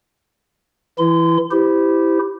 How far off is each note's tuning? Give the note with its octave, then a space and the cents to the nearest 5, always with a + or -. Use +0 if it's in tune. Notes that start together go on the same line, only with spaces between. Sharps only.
E3 +0 E4 +10 C6 -30
E4 +0 G4 +0 C5 -25